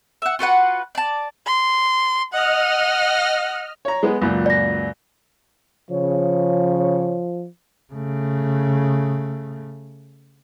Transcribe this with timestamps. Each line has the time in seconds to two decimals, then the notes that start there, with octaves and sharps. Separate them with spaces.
0.22 E5 F#5
0.39 F4 F#4 B4 F#5
0.95 D5 A5
1.46 C6
2.33 D#5 F#5 F6
3.85 C#5 A#5
4.03 G#3 B3
4.22 C#2 F#2 A#2
4.46 D5 A#6
5.90 C#3 F3 C#5
7.94 C#3 A3